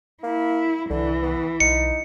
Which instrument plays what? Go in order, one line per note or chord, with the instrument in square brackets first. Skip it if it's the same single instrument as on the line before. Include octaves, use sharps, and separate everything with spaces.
[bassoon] A#3 [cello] E4
[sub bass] C2 [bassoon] D3 [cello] E3
[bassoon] B3
[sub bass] B1 [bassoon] D#4 [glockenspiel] C#7